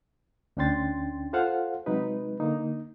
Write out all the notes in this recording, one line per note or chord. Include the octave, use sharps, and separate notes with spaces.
D2 C#4 D4 G5 C6 A6
F4 A4 C5 F5 F#5
C3 F#3 G#3 D#4 B4
D3 A#3 D#4